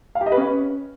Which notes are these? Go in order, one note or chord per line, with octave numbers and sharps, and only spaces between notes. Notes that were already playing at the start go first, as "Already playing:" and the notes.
F5
G4
D#5
B4
C#4